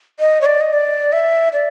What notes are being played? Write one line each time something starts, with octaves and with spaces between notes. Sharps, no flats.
D#5
C#5
D5
D#5
D5
E5
D5